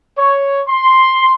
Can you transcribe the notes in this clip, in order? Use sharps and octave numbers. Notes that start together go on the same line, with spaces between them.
C#5
C6